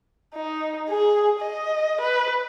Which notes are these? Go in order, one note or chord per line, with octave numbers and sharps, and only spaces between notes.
D#4
G#4
D#5
B4